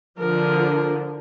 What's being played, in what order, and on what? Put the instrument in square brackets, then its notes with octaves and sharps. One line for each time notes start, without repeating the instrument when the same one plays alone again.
[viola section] D3 F3 [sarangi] A#4